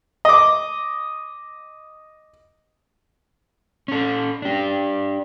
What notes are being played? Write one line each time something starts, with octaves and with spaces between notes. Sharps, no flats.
D#5 D6
C#4 A4
D4 G4